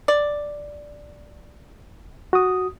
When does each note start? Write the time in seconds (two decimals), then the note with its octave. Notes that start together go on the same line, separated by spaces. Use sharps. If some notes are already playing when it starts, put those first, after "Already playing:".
0.08 D5
2.33 F#4 D#6